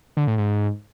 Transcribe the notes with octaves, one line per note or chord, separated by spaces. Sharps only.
D3
A2
G#2